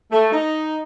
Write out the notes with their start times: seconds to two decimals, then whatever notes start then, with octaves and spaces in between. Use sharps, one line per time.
0.11 A3
0.32 D#4